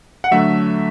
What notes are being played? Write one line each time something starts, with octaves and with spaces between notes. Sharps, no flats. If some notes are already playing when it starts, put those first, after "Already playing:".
F#5
D3 F#3 A3 E5